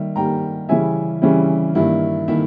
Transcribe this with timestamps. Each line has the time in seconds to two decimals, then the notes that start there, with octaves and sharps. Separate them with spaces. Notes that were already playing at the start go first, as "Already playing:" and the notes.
Already playing: D#3 G3 A#3 E5
0.16 D#3 G3 A#3 G5 A#5
0.69 C#3 E3 G3 C#4 E4 E5 G#5
1.22 C#3 E3 G3 C#4 E4
1.75 G2 D#3 A#3 E4
2.28 D#3 A#3 E4 E5